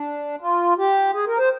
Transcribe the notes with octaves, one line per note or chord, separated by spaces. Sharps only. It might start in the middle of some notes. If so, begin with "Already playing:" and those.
Already playing: D4
F4
G4
G#4
A#4
C5